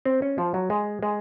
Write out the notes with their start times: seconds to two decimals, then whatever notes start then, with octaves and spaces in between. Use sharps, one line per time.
0.05 C4
0.22 C#4
0.38 F3
0.54 F#3
0.70 G#3
1.03 G#3